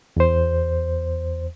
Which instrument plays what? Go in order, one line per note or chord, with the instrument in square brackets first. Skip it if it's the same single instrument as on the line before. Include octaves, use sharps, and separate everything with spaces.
[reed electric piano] E2 C5